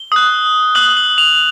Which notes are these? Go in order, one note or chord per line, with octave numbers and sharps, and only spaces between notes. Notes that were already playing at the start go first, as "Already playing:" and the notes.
Already playing: G7
D#6 F#6
D#6 F#6 F#7
F#7
F7